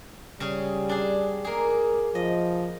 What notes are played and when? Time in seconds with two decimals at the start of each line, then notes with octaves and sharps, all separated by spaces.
0.40 C#3 G3 C#4 G#4
0.89 D4 G#4
1.45 A#3 G#4
2.15 F3 D#5